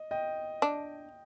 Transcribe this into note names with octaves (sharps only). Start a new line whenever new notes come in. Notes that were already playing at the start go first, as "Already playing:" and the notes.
Already playing: D#5
D#5 G5
D4